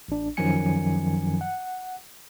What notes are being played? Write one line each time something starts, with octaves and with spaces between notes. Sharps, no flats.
A1 D4
F#2 D#3 F3 F#3 G#5 C#7
F#5